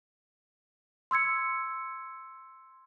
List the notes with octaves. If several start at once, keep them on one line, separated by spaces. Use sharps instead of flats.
C6 E6 G#6 C#7